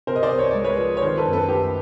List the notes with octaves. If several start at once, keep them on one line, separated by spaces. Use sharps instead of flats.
C3 A#4 C5
D#5
C5 D5
C2
C#5
G#3 D5
B4 C#5
F3
C#5
D#3 A#4 C5
A4 B4
F#2
A4 B4
A3 G4 A4